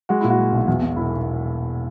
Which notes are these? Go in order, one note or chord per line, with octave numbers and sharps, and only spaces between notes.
G#3 F#4
A#2 E4
F#4
G#3
B1
E2 F#4
B2
E1 E4